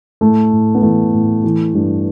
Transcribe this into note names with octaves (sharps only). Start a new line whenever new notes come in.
A2 A3
A2
B3
E3 A3
A2
E3
G2